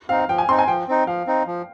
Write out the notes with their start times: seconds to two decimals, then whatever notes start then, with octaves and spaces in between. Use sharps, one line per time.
0.09 C4 D#4 F5
0.19 F5
0.28 F3 G5
0.38 G#5
0.48 C4 D#4 C6
0.59 G#5
0.68 F3 G5
0.88 C4 D#4
1.07 F3 F5
1.27 C4 D#4
1.47 F3